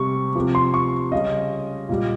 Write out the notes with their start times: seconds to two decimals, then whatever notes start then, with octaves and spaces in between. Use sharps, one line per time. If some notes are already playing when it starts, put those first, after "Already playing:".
Already playing: C3 G3 C#6
0.35 C3 F3
0.55 C6
0.74 C#6
1.12 C#3 G3 D#5
1.89 A#2 G3